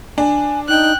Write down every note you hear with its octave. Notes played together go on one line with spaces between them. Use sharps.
D4 G#5
D#4 G5 F#6